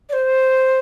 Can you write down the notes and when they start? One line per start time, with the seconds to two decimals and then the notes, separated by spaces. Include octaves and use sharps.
0.09 D5
0.13 C5